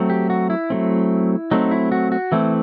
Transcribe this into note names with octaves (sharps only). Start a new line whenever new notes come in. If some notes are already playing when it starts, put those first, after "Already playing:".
Already playing: F#3 A3 C4
G4
F#4
E4
F#3 A3 C4
F#3 A3 C4 D#4
E4
F#4
F#4
E3 A3 C4 E4